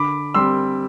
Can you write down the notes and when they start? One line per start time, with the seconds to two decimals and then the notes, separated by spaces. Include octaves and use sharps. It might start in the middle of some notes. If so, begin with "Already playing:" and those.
Already playing: D3 B5 D6
0.34 G3 C4 C6 E6